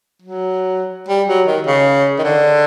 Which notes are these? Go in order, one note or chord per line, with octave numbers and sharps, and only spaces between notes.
F#3
G3
F#3
D#3
C#3
D#3
D3